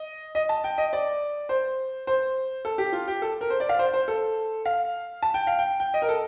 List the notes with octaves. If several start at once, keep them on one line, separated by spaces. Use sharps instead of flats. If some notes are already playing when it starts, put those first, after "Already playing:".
Already playing: D#5
D#5
A5
G5
D#5
D5
C5
C5
A4
G4
F4
G4
A4
A#4
C5
D5
F5
C5
C5
A4
F5
A5
G5
F5
G5
G5
D#5
A#4
A4